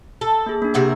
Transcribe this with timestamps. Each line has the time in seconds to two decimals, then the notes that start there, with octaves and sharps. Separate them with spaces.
0.21 A4
0.46 A#3 G#4
0.62 A#3 D4
0.74 C3 F#4 A#4